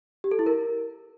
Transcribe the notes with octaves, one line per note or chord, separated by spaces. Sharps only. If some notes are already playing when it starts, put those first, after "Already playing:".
G4
A4
E4
A#4